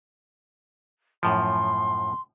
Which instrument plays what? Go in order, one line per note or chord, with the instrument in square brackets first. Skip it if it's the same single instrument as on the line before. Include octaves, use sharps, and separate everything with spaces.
[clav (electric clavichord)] F#2 A2 F3 [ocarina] C6